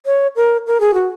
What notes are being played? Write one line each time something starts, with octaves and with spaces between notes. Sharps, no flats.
C#5
A#4
A#4
G#4
F#4